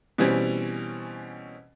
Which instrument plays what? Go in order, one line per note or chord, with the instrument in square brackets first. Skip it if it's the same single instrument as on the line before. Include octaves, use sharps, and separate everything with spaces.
[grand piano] B2 E3 G3 C4 C#4